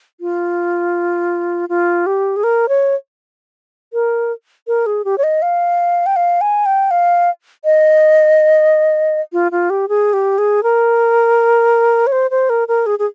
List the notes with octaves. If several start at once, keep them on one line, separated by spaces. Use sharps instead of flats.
F4
F4
G4
G#4
A#4
C#5
A#4
A#4
G#4
G4
C#5
D#5
F5
G5
F5
G#5
G5
F5
D#5
F4
F4
G4
G#4
G4
G#4
A#4
C#5
C5
C5
A#4
A#4
G#4
G#4